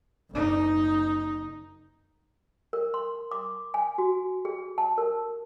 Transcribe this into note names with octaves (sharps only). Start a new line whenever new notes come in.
F#1 D#4
A#4
C6
D6
G#5
F#4
G#4
A5
A#4